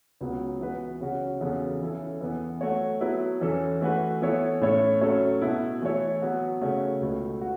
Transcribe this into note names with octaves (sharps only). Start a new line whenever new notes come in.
C#2 C#3 F#3 B3
E3 B3 F#4 B4
C#3 F#3 C#4 F#4
E2 C#3 F#3 B3 A4
E3 C#4 E4 A4
E2 E3 B3
F#3 A3 F#4 C#5
F#3 B3 E4 B4
E2 E3 C#4 A4
E3 A3 F#4 B4
E3 B3 E4 A4 C#5
A2 A3 C#4 A4 C#5
F#3 A3 C#4 A4 C#5
B2 B3 E4
E3 A3 E4 A4 C#5
F#3 B3 F#4
C#3 A3 F#4 C#5
C#2 B2 A3
F#4